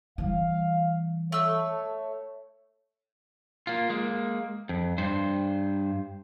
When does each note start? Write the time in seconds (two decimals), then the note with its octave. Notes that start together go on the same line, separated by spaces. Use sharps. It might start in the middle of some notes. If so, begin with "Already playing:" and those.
0.18 E3 G3 F5
1.32 A3 A4 C#5 E6
3.67 A#3 F4
3.90 G#3 A#3
4.69 F2
4.98 G2 C5